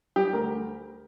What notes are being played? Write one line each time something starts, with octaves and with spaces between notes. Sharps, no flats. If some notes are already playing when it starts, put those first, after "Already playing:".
G3 G4
D2 A#4